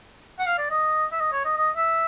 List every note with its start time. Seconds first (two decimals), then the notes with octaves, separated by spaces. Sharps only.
0.39 F#5
0.46 F5
0.58 D5
0.71 D#5
1.12 E5
1.21 D#5
1.32 C#5
1.45 D#5
1.57 D#5
1.76 E5